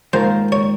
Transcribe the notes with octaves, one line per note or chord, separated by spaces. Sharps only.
G#2 D#3 A#3 F4 A#4 C5
C#5